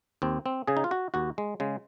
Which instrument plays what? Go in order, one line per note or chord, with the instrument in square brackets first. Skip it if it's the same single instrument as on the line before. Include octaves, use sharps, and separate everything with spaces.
[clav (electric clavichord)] D#2 C4
C4
C#3 G#4
D#4
F4
F#4
D#2 F#4
G#3
C#3 G#3